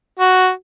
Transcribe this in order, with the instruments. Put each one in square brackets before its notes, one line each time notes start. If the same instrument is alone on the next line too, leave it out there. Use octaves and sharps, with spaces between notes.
[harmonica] F#4